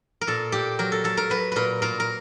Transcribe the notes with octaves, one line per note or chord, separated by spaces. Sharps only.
A#4
A#2 A4
A#2 G4
F#3 A#4
A4
F#3 A4
A#4
F#3 B4
A#2 A#4 B4
A#2 A#4
A#4